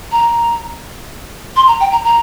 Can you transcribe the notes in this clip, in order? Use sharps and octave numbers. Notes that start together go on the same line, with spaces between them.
A#5
C6
A#5
G5
A#5
A#5